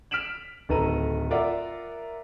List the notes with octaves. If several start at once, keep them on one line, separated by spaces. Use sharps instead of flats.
F6 B6 D7 E7 F#7
D1 D#3 A4 B4 A#5 D#7
F4 A#4 D5 E5 F#5